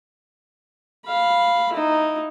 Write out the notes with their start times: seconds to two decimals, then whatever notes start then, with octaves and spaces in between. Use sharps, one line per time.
1.06 F5 B5
1.73 D#4 E4